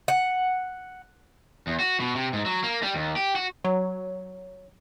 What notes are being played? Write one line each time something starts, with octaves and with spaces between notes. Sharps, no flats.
F#5
E2
F#4
B2
C3
G#2
F#3
A#3
G3
D#2
G4
F#4
F#3 C#5